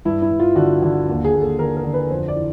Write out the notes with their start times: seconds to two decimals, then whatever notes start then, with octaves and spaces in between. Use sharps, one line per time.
0.05 G2 E4
0.22 E4
0.31 G2
0.39 F4
0.56 D3 F#4
0.82 D3
1.08 D#2
1.24 G#4
1.33 D#2
1.41 A4
1.59 D3 A#4
1.77 A#4
1.85 D3
1.94 B4
2.10 F2 C5
2.28 D5
2.36 E3